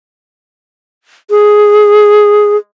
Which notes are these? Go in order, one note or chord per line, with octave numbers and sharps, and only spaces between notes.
G#4